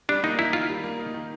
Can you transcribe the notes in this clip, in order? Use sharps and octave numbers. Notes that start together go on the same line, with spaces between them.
G3 D4
A#3 D#4
D#4 E4
D#3 F4
G3
A#3
D#4
D#3